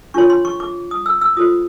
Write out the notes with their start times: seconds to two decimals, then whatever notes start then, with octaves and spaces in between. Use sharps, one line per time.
0.14 D4 F4 A#4 C#5 C#6
0.30 C6
0.45 C#6
0.60 D6
0.91 D#6
1.06 E6
1.21 E6
1.37 F4 A4 C5 D#6